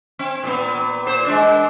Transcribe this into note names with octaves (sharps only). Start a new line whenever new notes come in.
C4
A#2 B3
A#2 C5
G#3 D4